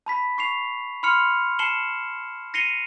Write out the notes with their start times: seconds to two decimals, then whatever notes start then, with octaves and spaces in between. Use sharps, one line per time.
0.06 A5 B5 B6
0.38 C#6 C7 F7
1.03 B5 C6 F6 C#7 F7
1.59 A5 C7 C#7 E7 F#7 G7
2.54 A#6 C7 C#7 D#7 F7 G7